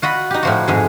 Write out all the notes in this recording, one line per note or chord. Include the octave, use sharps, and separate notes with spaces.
F4 F#4 D#5 B5
D#4 G4
A2 F3 F#4
F2 G#2 G#4